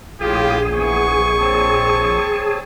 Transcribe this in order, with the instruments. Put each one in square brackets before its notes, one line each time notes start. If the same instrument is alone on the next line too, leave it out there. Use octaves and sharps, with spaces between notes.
[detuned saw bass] A#1 [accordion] A2 F4 [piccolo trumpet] G4 [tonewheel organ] G#4
[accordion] E3 B3 [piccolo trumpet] C#6
[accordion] C4 C#5 A5